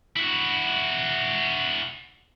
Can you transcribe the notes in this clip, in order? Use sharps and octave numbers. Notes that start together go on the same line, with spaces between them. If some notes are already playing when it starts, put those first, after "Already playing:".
E4 F#4